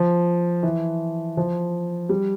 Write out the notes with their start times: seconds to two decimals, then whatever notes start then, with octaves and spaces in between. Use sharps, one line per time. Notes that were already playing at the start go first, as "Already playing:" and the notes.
Already playing: F3
0.63 E3
1.37 F3
2.09 G3